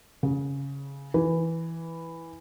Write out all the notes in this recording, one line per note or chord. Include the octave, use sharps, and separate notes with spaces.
C#3
E3